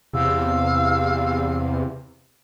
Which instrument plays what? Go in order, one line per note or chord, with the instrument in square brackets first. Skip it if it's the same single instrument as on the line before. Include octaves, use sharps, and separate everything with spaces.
[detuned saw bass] E2 [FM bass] C3 [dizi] F5 [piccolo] E6